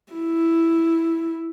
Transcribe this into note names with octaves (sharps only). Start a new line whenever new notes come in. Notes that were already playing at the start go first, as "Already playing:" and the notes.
E4